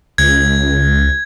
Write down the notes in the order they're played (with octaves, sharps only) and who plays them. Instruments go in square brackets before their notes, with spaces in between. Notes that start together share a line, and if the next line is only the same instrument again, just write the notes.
[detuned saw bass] C#2 [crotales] G#6